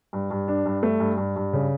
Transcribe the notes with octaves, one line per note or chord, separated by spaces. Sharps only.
G2
G2
D4
G2
A3
G2
G2
G2
C#3